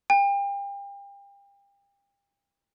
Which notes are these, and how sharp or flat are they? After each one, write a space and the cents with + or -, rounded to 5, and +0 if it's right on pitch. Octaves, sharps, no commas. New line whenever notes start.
G5 +35